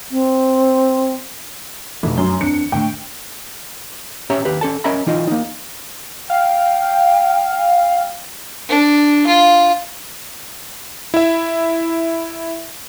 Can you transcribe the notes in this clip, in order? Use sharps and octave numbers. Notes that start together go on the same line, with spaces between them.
C4
F1 B2 E3
F#2 C6
E2 C4 D4 C#7
A2 D3 A3 G5
C#4 G4 C#5 E5 A#5
D#2 G4 B4
C#4 A4 A5
C#4 A#4 D#5 E5 A#5 B5
E3 D#4 F4 D#5
A#3 D#4
F5 G5
D4
F4
E4 E5